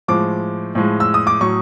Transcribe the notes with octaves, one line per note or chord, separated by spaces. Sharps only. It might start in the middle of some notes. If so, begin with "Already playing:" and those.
A2 F3 G#3 D6
A2 F3 G#3
E6
D#6
D6
A2 F#3 C#6